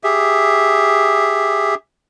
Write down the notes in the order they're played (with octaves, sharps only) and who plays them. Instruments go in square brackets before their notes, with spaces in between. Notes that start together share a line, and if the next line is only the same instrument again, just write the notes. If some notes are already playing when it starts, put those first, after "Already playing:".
[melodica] G4 G#4 E5